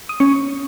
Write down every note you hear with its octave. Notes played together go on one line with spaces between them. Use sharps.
D#6
C#4 C#6